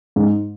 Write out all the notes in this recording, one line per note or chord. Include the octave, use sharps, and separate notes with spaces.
G#2